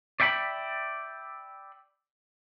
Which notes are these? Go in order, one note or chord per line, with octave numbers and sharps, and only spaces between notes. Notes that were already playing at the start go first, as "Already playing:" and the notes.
D5 E5 G5 A#5 B5